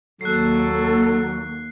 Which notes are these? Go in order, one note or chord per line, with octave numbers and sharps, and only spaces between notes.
D#2 F#3 A4 F#6 C7